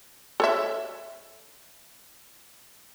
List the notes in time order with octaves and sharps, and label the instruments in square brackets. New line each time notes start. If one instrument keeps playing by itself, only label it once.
[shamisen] A4 C#5 E5